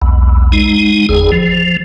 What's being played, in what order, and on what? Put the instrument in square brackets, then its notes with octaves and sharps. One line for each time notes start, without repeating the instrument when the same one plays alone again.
[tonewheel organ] B1 E2
G#3 D#4
G1 E2 G#4
F3